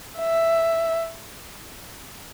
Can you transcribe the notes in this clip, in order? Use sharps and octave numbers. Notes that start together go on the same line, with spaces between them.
E5